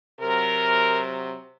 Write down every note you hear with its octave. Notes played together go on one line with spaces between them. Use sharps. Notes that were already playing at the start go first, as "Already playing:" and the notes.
C3 F#3 A#4